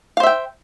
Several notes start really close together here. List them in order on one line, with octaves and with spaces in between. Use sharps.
F5 C5 E5 G5